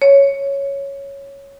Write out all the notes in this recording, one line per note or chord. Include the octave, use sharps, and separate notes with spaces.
C#5